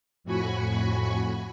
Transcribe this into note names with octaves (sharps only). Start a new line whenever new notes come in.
F2 A2 F#4 G#5 B5 C#6